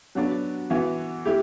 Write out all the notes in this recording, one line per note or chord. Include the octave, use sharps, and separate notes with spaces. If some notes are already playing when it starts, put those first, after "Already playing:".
F#3 B3 D4 F#4
E3 B3 F#4
A3 E4 G4